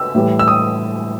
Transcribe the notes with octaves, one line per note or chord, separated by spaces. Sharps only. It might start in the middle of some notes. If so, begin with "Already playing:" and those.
Already playing: E6
A2 E3 G3
E6
D#6